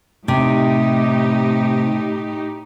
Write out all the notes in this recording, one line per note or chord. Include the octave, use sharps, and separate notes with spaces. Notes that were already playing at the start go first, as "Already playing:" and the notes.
A2 C3 D#4 G4